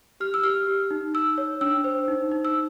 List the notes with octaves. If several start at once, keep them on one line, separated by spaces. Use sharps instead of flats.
G4 F6
E6
G4 F6
G4
D#4
D#4 E6
C#5
D4 E6
C5
D#4
D#4
E6